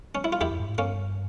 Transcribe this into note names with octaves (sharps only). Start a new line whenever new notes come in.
C#4
E4
F4
E2 E4 G4
F2
G2
G#2
G2 A#3 C#4